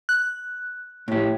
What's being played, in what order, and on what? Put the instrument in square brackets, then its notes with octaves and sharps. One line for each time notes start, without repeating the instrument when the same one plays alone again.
[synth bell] F#6
[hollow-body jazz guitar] A2 G4